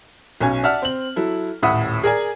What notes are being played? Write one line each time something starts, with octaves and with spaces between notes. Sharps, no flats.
B1 C#4 G#5
D5 E5 F#5 A5 F6
C4 F#7
F#3 E4 A4
D#1 A2 E5 F#5 B5 D#6
G#4 A#4 D5 G#5